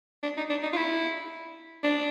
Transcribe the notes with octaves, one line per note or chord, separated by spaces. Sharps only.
D4
D#4
D4
D#4
F4
E4
D4